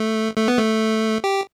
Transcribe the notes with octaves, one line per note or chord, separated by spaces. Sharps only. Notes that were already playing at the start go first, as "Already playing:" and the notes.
Already playing: A3
A3
B3
A3
G4